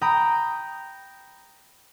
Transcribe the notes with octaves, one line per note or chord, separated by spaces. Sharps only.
G5 A#5 B5 D#6